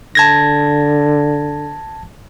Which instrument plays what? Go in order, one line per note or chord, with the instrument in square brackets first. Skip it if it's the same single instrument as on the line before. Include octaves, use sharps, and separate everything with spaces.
[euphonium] D3 [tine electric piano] A5 G#6 A#6